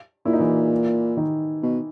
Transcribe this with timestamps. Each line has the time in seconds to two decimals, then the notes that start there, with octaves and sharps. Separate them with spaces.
0.25 A#2 E4
0.33 D#4
0.40 E3 E4
1.17 D#3 D#4
1.63 B2